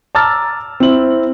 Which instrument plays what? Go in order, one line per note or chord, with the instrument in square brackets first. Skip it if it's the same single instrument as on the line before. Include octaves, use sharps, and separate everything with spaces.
[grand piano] A5 A#5 D6 E6 F6 A6
C4 E4 F#7